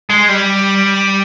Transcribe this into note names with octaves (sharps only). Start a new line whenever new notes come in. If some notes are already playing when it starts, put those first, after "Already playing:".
G#3
G3